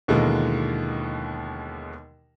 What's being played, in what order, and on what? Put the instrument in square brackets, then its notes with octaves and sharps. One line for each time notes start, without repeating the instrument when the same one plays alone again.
[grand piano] D#2 B2 D3 E3 G#3 A#3